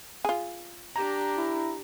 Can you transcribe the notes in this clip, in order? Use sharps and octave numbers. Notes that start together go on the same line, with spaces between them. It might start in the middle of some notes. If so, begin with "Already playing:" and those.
F4 G#4
D4 G4 A#5
E4